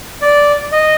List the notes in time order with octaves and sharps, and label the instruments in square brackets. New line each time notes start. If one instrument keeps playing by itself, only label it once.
[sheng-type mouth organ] D5
D#5